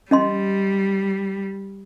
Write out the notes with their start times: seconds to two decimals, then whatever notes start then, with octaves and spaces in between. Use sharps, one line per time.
0.11 G3 C#4 D#5 C6